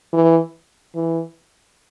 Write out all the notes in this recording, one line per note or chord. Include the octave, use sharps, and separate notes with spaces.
E3
E3